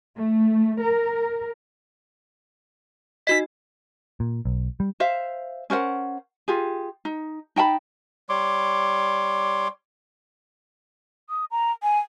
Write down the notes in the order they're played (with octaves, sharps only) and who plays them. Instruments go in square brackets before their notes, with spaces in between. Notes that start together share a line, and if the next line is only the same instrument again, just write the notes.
[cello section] A3
A#4
[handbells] D#4 F#4 D#5 [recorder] B6
[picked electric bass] A#2
B1
G3
[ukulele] C5 E5 F5
C#4 A#4 C5 F#5
F4 G4 G#4
D#4
D#4 G5 A5 B5
[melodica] G3 C#5 C6 D6
[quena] D#6
A#5
G#5